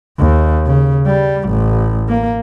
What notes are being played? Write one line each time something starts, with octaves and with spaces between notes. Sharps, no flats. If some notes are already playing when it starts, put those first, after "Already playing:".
D#2
C#3
G3
A1
A#3